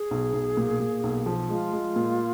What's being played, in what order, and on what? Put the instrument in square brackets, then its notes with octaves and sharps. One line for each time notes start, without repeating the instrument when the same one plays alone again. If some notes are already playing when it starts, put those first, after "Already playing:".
Already playing: [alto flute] G#4
[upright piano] B1
B1
A#2
A#2
B1
F3
[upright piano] G#3 [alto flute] F4
[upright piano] G#3
A#2